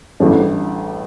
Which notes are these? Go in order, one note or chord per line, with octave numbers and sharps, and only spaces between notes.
A1 A2 G3 D4 A4